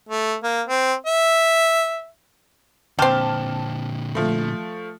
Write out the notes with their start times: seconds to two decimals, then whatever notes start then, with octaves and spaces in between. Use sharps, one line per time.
0.09 A3
0.43 A#3
0.68 C4
1.06 E5
2.99 A#2 D3 C4 G4 A5 F6
4.15 F3 A3